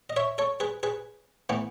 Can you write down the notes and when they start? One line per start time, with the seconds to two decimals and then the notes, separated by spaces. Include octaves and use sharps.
0.10 D#5
0.16 C#5 E5
0.38 A4 C#5
0.60 G#4 B4
0.83 G#4 B4
1.49 A2 E3 B3